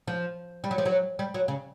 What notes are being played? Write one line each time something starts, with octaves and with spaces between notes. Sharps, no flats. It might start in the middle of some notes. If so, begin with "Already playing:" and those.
F3
G3
F#3
F3
F#3
G3
F#3
C#3